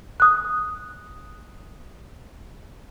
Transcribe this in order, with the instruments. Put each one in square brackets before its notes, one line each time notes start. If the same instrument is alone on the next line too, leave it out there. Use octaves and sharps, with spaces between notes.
[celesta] D#6 F#6